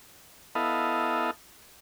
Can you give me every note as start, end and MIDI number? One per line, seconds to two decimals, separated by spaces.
0.55 1.31 59
0.55 1.31 64
0.55 1.31 69
0.55 1.31 75
0.55 1.31 77